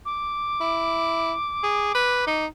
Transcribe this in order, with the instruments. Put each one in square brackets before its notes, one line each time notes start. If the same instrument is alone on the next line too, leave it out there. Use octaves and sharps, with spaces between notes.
[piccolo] D6
[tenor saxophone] E4
G#4
B4
D#4